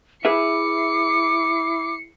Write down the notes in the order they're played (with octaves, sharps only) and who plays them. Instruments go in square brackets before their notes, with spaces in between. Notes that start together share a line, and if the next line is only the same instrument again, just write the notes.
[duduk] E4 [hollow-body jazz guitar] G#4 B4 E5 [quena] D6 [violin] C7 C#7